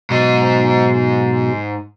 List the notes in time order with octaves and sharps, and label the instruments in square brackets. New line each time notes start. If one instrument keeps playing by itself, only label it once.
[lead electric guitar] G#2 D#5 [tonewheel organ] B2 F#3